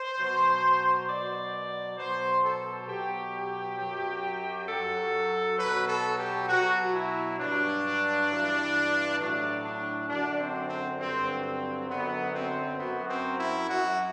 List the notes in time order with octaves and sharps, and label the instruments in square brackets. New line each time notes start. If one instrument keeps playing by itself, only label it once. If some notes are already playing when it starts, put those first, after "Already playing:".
Already playing: [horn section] C5
B2 F#3
B2 F#3 D5
B2 F#3 C5
A4
B2 F#3 G4
F#2 F#3
F#2 F#3 A4
B2 F#3 B4
A4
G4
B2 F#3 F#4
E4
G2 F#3 D4
G2 E3
A2 F#3 D4
D4
F#2 D3 F#3 D4
C4
C4
G2 D3 F#3 C4
C4
F#2 D3 F#3 B3
C4
F#2 F#3 B3
C4
E4
F#2 F#3 F#4